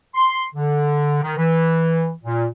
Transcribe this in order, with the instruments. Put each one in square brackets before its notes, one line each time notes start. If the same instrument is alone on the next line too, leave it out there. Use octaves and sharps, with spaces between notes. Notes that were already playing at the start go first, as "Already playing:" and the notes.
[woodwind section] C6
D3
D#3
E3
A#2